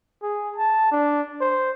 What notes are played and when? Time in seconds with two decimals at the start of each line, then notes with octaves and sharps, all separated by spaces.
0.23 G#4
0.56 A5
0.92 D4
1.41 C5